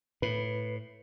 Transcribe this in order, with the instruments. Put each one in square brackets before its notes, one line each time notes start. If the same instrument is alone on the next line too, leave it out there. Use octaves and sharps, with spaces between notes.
[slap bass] A2 [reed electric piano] B4